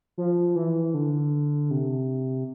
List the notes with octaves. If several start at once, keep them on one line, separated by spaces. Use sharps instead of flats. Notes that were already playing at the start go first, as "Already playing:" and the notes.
F3
E3
D3
C3